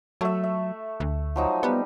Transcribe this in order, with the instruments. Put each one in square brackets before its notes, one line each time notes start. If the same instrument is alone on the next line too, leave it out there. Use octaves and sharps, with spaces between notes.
[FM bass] F#3 [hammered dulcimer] A3 E5
[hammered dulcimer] E5
[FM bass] D2
[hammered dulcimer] F3 F#3 D#4
[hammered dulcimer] G3 [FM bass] B3